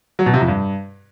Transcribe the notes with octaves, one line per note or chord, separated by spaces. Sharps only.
F#3
B2
C3
F2
G2